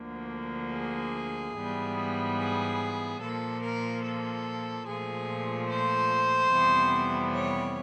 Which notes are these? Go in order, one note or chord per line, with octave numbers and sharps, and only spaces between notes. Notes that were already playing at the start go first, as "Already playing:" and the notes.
Already playing: D2 D3 F3 A#3
G#4
G#2 E3 G3 B3
G#4
A#2 F3 A#3 A4
A#4
A4
A#2 F3 A3 G#4
C5
F2 C3 E3 G3 B3
C#5